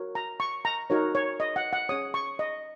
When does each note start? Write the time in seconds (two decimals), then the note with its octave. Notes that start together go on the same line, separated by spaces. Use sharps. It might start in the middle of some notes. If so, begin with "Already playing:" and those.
Already playing: F#4 A#4 C#5
0.15 A#5
0.40 C#6
0.65 A#5
0.90 D#4 F#4 A#4 C#5
1.15 C#5
1.40 D#5
1.56 F#5
1.73 F#5
1.89 C#4 G#4 C#5 D#6
2.14 C#6
2.39 D#5